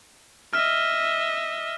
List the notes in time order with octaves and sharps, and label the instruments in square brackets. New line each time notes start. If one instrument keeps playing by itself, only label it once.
[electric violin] D#5 E5 [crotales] F6